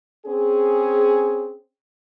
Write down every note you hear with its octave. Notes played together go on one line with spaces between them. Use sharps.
C4 C#4 G#4